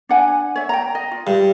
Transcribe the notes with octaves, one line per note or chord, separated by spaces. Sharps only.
D4 F#5 G#5
C#5 E5
G5 A#5
D#5
F4
G2